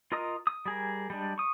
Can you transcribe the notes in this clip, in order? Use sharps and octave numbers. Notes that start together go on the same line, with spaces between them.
F4 A#4 D#5 A#5 D#6
D#6
G3 G#4 A#4
G3 G#3 D4
C#6 D#6